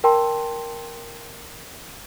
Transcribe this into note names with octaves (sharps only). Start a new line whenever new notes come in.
A#4 G5 A5 C6